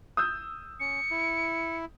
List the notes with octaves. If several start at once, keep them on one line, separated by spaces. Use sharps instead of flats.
D#6 E6 G6
C#4 C#7
E4